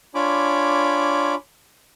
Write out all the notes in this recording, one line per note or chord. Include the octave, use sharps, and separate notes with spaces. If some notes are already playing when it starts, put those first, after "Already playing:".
D4 F4 C#5 G#5 B5 D6